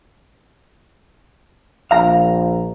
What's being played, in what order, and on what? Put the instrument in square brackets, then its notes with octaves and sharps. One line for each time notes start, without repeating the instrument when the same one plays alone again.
[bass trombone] A#1 [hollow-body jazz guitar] F5 A#5